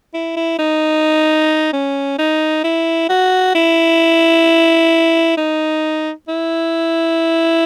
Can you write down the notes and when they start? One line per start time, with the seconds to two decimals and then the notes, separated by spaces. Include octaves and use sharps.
0.14 E4
0.37 E4
0.59 D#4
1.73 C#4
2.19 D#4
2.64 E4
3.09 F#4
3.55 E4
5.37 D#4
6.28 E4